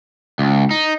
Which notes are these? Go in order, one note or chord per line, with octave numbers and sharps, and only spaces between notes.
C#2
D#4